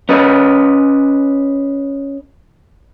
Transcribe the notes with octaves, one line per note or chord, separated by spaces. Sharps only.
C#4 B4 D#5